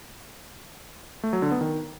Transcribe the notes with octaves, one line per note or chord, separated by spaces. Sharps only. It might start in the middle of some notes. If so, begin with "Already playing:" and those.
A3
F#3
D3
B3
D#3